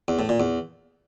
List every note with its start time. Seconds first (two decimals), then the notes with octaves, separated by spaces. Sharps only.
0.08 E2
0.19 A2
0.29 A#2
0.40 E2